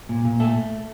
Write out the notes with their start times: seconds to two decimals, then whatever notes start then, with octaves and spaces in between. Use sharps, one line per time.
0.09 A#2
0.25 A#2
0.40 A3 A4